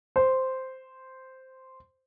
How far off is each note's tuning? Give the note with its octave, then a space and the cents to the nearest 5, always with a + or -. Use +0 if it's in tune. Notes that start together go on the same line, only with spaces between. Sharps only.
C5 -5